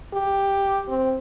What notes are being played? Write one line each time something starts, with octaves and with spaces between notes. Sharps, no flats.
G4
C4